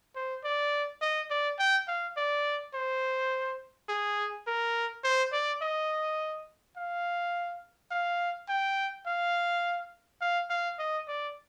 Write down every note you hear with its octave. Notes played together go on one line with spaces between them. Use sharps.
C5
D5
D#5
D5
G5
F5
D5
C5
G#4
A#4
C5
D5
D#5
F5
F5
G5
F5
F5
F5
D#5
D5